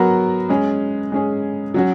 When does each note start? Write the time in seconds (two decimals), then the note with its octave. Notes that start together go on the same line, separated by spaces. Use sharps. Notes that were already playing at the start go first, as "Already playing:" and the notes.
Already playing: F#3 B3 F#4 A#4
0.49 G#3 C#4 G#4
1.12 G#3 C#4 G#4
1.74 F#3 C#4 F#4